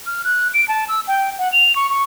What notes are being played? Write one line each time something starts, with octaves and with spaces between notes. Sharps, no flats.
F6
F#6
D7
A5
E6
G5
F#5
F7
C#6
C#6